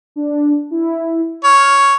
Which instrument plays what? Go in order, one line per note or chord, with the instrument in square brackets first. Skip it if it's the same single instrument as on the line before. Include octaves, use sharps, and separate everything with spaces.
[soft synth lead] D4
E4
[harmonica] C#5 [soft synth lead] F6